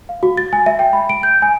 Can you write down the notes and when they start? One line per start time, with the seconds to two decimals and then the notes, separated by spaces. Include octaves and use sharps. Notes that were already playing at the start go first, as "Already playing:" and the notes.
0.09 F5
0.23 F#4
0.37 A6
0.53 G#5
0.66 E5
0.79 G5
0.93 B5
1.09 D7
1.23 G6
1.42 G#5